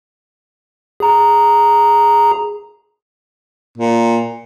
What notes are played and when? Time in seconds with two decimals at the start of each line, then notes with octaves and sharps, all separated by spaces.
1.00 G#4 A#5
3.78 A#2